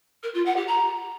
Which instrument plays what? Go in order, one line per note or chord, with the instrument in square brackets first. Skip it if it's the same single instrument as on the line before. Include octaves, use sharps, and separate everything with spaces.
[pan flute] A#4
F4
F#5
G4
A#5